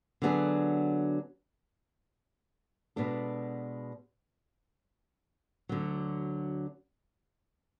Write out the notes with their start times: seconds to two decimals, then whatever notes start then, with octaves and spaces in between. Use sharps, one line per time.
0.22 D3 F#3 B3 D4 G#4
2.96 B2 G#3 B3 D4 A4
5.69 D2 D3 F#3